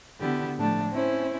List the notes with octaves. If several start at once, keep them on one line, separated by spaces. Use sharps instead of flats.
D3 B3 E4 F#4 G4
A2 F3 A3 D4
C4 C#4 E4 C5